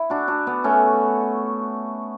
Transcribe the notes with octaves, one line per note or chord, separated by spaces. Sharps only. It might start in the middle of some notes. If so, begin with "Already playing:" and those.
Already playing: E4
D4 F#4
D4 F#4
B3 D4
A3 C#4